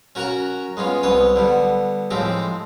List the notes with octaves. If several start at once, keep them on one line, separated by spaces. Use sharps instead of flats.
C#4 F#4 A#4 F#5 A#5 C#6
G#3 B3 C#4 F4
C2 B3 B4 C#5 D#6
D3 G3 B3
A2 F3 G#3 C4 G4